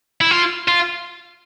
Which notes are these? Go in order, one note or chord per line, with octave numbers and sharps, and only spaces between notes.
E4
F4
F4